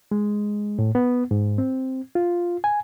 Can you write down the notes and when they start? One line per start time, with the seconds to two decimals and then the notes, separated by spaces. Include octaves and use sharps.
0.11 G#3
0.79 A2
0.95 B3
1.31 G#2
1.58 C4
2.15 F4
2.64 G#5